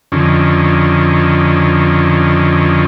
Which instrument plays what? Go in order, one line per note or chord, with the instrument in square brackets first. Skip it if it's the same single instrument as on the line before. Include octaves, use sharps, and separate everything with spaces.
[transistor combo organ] F2 D3 D#3 C#4